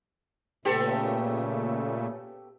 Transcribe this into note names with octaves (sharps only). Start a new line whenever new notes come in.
A#2 C#3 A3 B3 G4 A4